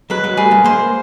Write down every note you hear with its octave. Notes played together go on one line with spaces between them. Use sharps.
F#3 G#3 B4
F#3 G#3
G3 A3 G#4
G#3 A#3
G#3 A#3 C5